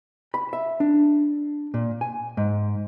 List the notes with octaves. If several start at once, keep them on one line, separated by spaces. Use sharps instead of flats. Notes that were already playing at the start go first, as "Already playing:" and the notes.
B5
E5
D4
A#2
G#5
G#2